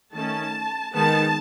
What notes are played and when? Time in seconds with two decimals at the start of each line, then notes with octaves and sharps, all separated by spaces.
0.13 D#3 A3 C#4 A5
0.93 D#3 G#3 B3 A5